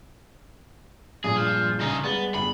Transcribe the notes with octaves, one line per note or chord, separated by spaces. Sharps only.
G2 A#2 G#3 G#4
F3
C#3 D#4
G3 G#3 B3 A6
G1 G#4 B5